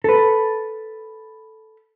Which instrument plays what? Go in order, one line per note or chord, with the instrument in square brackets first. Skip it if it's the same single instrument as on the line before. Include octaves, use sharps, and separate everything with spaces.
[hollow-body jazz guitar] A4 B4